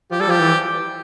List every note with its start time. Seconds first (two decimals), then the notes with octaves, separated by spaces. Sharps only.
0.11 F3 G4
0.19 G3 A4
0.28 F3 G4
0.40 E3